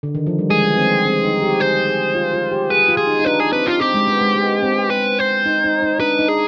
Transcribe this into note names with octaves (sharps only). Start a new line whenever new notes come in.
D3
D#3
F3
G3
G#3 G#4
B3
C4
C4
D#4
G4
G#4 C5
G#4
F4
F4
G4
G#4 B4
F4
G#4
D#4
D#4
D4 B4
G#4
C4 B4
F4
C4 G4
G#3
B3
G#3
B3
C4
B4
C5
D#4
D#4
D#4
D4 B4
D#4
G#4